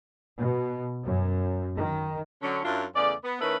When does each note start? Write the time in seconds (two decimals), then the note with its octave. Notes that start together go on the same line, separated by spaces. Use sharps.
0.38 B2
1.05 F#2
1.77 D#3
2.42 D3 F#3 C#4
2.64 F#2 D4 E4 F4
2.95 E2 C#3 A3 D5
3.23 B3
3.40 D#3 A3 C#4 E4 A#4 B4